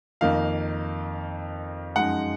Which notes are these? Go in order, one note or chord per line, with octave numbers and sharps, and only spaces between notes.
F2 D#3 A#3 D#4 F5
F#2 F3 G#3 D#4 F#5